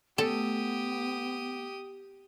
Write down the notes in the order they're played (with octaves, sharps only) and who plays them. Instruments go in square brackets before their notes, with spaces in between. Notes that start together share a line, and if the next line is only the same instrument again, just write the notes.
[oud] A3 C#4 [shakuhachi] B3 [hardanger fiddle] G4 D#6 [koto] A4